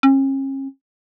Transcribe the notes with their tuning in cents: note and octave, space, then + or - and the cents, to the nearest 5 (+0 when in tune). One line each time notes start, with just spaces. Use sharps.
C#4 -40